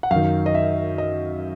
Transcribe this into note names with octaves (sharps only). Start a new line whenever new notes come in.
F#5
F#2 D#3 F5
D#5
E5
D#5